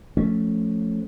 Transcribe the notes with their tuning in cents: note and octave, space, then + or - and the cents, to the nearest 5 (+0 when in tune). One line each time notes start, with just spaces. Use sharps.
F3 +0 A3 -5 C#4 +0